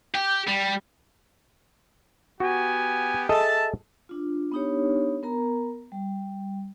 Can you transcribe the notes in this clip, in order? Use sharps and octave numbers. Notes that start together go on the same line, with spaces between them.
G4
G3
B3 F#4 G4 G#5
G#4 A4 D#5 E5 A5
D4 F4
B3 D4 D#4 G4 C#5
B3 A#4 A#5
G3